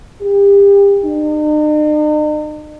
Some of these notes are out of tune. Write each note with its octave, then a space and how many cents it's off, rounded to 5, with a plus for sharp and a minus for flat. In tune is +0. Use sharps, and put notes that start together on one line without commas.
G4 +35
D#4 -45